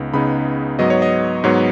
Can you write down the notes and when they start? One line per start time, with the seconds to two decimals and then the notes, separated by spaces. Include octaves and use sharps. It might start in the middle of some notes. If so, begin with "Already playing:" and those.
Already playing: C#2 C#3 B3 D#4
0.13 C#2 C#3 B3 D#4 B5
0.79 G#2 F#3 B3 D#5
0.90 C#5
1.02 D#5
1.44 G#2 F#3 B3 C#5